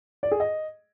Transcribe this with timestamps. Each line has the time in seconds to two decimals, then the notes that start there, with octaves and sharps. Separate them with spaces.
0.23 D5
0.31 G#4
0.40 D#5